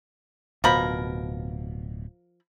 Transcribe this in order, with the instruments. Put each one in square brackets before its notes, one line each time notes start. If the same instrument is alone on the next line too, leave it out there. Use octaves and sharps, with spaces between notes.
[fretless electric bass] D1 B2 [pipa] F3 A#4 B5